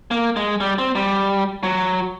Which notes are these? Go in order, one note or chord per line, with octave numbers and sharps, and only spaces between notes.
A#3
G#3
G3
C4
G3
F#3